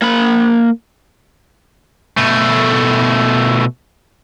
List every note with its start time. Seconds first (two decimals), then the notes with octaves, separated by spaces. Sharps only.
0.02 A#3 B5
2.17 B2 A3